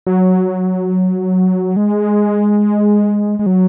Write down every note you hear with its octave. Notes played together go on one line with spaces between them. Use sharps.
F#3
G#3
G#3
F#3